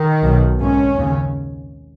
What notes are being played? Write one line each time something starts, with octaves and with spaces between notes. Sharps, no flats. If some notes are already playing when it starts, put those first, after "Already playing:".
Already playing: D#3
B1 B2
G#1 G#2 C#4
D#2 C#3